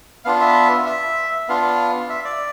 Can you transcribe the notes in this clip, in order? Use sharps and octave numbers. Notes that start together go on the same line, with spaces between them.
B3 D4 F4 F5
E5
E5
B3 D4 F4 F5
E5
D5